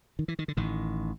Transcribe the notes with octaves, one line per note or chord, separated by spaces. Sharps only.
D#3
E3
D#3
D3
A1 A2 D#3